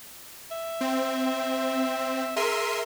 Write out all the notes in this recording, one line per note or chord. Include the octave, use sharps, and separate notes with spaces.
E5
C4
G#4 A#4 E5 C6